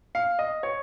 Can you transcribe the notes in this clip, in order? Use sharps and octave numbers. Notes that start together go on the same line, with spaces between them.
F5
D#5
C#5